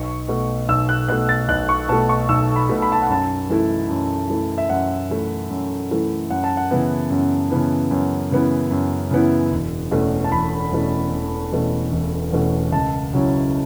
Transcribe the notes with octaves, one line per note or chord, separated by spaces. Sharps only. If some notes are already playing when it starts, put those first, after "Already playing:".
Already playing: B1 C#6
B2 A3
B1 E6
F#6
B2 A3 F#6
A6
B1 F#6
C#6
B2 A3 A5
C#6
B1 E6
B5
B2 A3
B5
A5
F#5
F#2 A5
E3 A3 E4
F#2
E3 A3 E4
E5
F#2 F#5
E3 A3 E4
F#2
E3 A3 E4
F#2 F#5
A5
F#5
C#3 E3 B3 E4
F#2
C#3 E3 B3 E4
F#2
C#3 E3 B3 E4
F#2
C#3 E3 B3 E4
E1
E2 B2 A3 C#4
A5
E1 B5
E2 B2 A3 C#4
E1
E2 B2 A3 C#4
E1
E2 B2 A3 C#4
C#2 A5
C#3 F#3 C#4 E4